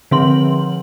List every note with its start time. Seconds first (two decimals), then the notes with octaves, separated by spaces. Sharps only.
0.11 D3 F3 C4 C6 F#7